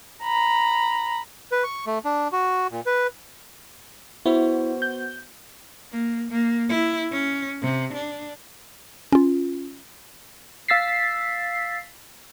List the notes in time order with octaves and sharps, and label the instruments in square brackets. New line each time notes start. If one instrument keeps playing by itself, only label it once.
[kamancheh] A#5 B5
[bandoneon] B4
C#6
A3
D4
F#4
A#2
B4
[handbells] B3 F#4 C5 [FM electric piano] E4
[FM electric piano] G6
[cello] A#3
A#3
E4
C#4
C3
D4
[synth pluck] C#4 F4
[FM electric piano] F5 E6 A6 B6 C7